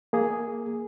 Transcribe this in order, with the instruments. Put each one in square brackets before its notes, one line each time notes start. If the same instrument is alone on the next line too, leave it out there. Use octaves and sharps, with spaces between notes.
[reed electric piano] A#3 G#4